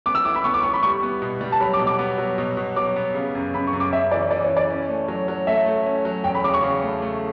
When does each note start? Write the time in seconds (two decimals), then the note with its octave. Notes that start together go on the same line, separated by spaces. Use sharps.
0.06 B3 D6
0.15 E6
0.25 E4 D6
0.35 B5
0.44 B3 C#6
0.54 D6
0.63 B3 C#6
0.73 B5
0.83 G3 C#6
1.03 B3
1.22 B2
1.41 G3
1.52 A5
1.60 F#3 B5
1.73 D6
1.79 B2
1.87 D6
1.99 B3
2.18 F#3
2.38 B2
2.57 B2
2.76 F#3 D6
2.96 B3
3.15 C#3
3.35 F#2
3.54 F#2 B5
3.67 C#6
3.73 F#2
3.80 D6
3.92 F#2 E5
4.11 E3 D5
4.31 E3 D5
4.44 C#5
4.50 E3
4.57 D5
4.70 C#4
4.89 A3
5.08 F#3
5.28 F#3
5.47 A3 E5
5.66 A3
5.86 C#4
6.05 F#3
6.24 E2 G5
6.34 B5
6.44 C#3 D6
6.54 C#6
6.63 C#3
6.82 A3
7.02 A3